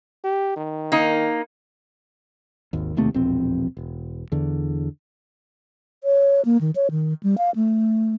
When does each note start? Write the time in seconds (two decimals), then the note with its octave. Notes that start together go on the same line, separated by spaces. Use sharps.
0.24 G4
0.56 D#3
0.92 A#3 D#4
2.73 G#1 D#2
2.97 E1 D#2 C3 A3
3.14 E1 A#1 F2 C4
3.77 E1
4.32 E2 D3
6.04 C#5
6.45 A#3
6.61 D#3
6.76 C#5
6.91 D#3
7.23 G3
7.38 F5
7.55 A3